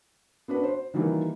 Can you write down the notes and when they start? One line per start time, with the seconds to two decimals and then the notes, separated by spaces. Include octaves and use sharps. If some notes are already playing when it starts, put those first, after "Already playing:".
0.48 B3 D4 F#4 B4
0.64 C5
0.94 D#3 E3 F#3 G3 A#3